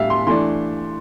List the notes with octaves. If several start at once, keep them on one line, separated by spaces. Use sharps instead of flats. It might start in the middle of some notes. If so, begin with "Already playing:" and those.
Already playing: A2 G3 D4 E5 F5
C6
E3 A3 D4 C6